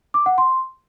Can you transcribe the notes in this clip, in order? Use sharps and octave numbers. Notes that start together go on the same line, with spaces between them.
D6
F#5
C6